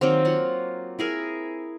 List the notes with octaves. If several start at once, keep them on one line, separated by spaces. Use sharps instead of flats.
D#3 F#3 A#3 C4
F#3 F4 F#5
E4 G#4 A#4